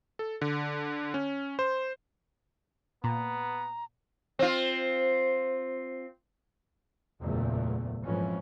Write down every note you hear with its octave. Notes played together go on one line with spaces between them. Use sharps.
A4
D3
C#4
C5
A#2 B3 A#5
C4 F4
F#1 E2 A#2 A3
F2 G#2 E3 C#4